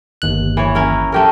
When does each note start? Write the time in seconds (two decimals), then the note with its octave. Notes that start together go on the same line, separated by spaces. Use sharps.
0.22 G1 D#2 F#6
0.57 E3 C#5
0.75 C#4 E4 A#4
1.12 A3 G4 A#4